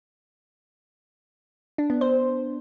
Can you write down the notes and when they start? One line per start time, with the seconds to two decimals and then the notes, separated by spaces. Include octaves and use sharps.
1.78 D4
1.90 B3
2.01 C5